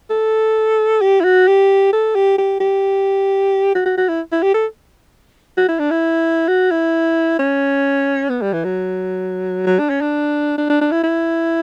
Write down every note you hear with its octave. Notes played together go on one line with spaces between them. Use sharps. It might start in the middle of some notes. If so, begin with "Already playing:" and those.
A4
G4
E4
F#4
G4
A4
G4
G4
G4
F#4
F#4
F#4
E4
E4
G4
A4
F#4
E4
D4
E4
F#4
E4
C#4
B3
G3
E3
F#3
F#3
D4
C#4
D4
D4
D4
D4
E4
E4